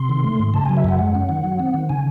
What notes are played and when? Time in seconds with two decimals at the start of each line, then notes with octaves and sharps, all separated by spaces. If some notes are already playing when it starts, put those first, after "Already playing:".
Already playing: C3 C6
0.09 D#3
0.24 A3
0.39 G#2
0.54 C#3 A5
0.65 F#3 G#5
0.77 E5
0.84 F#2 F#5
0.99 G#3
1.15 C#4
1.29 D#3
1.44 F#3
1.60 C4
1.74 D#3
1.89 C#3 G#5